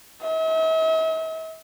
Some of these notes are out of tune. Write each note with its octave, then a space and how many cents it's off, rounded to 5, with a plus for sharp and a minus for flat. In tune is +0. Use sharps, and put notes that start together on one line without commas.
E5 -45